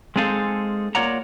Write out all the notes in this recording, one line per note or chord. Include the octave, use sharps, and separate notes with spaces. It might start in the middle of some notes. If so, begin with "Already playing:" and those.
G#3 C4 D#4 G#4 A4 F5
A#3 F4 C#5 D5 F#5 A#5